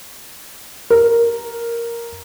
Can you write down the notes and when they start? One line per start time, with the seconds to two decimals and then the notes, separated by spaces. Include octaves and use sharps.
0.90 A#4